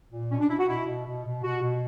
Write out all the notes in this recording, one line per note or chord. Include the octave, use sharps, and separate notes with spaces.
A#2
B2 C#4
D4
B2 E4
F#4
B2 E4
B2
B2
B2
B2 F#4
B2